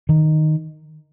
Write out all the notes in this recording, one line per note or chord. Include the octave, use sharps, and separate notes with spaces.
D#3